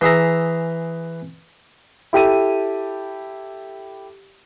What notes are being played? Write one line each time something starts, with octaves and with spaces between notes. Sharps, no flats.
E3 G#4 E5 A#5
E4 G4 A4 D#7